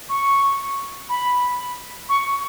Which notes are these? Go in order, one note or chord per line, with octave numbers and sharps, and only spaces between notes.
C#6
B5
C#6